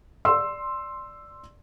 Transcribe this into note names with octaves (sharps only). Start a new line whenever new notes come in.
D5 C6 E6